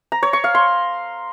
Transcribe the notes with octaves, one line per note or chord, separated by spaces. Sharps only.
A#5
C#5
C#6
F5
C6